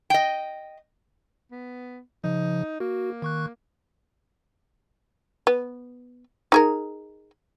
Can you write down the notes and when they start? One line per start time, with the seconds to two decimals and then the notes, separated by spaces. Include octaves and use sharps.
0.10 D#5 G5
1.51 B3
2.24 C#3 F3 D#4
2.80 A#3 F#4
3.22 D#3 C#6 F#6
5.47 B3
6.52 D#4 G#4 A#4